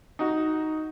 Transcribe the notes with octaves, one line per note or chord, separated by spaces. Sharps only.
D#4 F#4